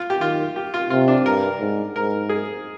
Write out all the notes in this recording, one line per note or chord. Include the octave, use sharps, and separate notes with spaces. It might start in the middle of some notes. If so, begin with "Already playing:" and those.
Already playing: F4
G4
D#3 F4
G4
F4
C3 F4
D4
G2 A#4
G#2
G#2 A#4
G#4